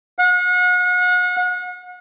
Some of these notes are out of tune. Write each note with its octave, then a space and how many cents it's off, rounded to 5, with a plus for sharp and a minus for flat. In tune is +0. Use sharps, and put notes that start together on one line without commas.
F#5 -40